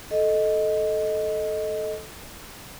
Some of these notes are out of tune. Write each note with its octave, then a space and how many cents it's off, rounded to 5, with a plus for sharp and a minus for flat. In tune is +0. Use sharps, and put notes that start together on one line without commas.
A4 -10 D#5 +0